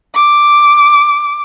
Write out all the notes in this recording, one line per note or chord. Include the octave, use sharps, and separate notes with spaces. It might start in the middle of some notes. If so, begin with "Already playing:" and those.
D6